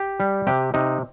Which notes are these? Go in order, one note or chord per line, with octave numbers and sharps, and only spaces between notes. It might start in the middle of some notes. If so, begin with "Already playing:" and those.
Already playing: G4
G3
C3 G4
C3 D#4